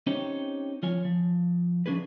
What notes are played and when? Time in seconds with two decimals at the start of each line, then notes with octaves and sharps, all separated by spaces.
0.07 C4 C#4 D#4 G4 C5 C#5
0.83 F3 F4 C#5 G#5
1.05 F3
1.86 F3 C#4 D4 G#4 B4